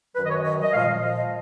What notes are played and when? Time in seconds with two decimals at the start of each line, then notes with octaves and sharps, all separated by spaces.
0.15 F#2 D#3 F#3 B4
0.25 D#5
0.30 C#5
0.44 D#5
0.62 D#5
0.73 A#2 F3 G#3 F5
1.02 D#5